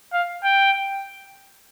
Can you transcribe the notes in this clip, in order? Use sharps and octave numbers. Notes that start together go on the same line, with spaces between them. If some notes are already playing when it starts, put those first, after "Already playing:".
F5
G5